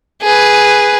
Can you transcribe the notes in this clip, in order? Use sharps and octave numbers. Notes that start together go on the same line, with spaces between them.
G#4 B4